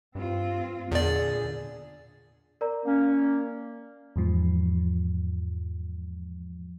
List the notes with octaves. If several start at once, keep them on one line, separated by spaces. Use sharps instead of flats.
G2 C4 F4
E2 A#2 D3 G#4 D5
A#4 D5 A#5
A#3 C#4
E2 G#2 F3